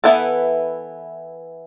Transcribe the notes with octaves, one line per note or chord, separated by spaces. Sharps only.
E3 B3 E4 A4